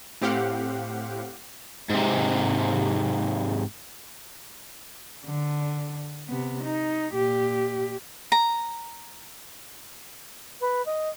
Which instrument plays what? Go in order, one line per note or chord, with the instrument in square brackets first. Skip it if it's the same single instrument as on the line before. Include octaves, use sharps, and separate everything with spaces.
[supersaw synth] A2 C4 G4 F5 F#5
[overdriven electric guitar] G#2 C3
[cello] D3
C3 B3
D#4
A#2 G4
[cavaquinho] A#5
[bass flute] B4
D#5